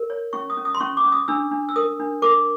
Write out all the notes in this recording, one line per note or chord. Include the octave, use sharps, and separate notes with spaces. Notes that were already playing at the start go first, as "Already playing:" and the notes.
Already playing: A#4
C#5
C#4 C#6
D#6
C#4
D#6
C6
C#4 C#6
D6
C#4
D#6
D4 E6
D4
E6
A#4 D#6
D4
A#4 D6